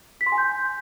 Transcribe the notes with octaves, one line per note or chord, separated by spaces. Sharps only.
B6
C6
G#5
G6